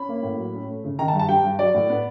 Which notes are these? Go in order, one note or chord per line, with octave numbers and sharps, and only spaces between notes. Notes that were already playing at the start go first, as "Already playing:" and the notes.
Already playing: C#4 B5
A#3
A2
F#3
C#4
A3
C#3
D#3 A#5
A5
G2
A5
G3 G5
G2
F#3 D5
A2
B3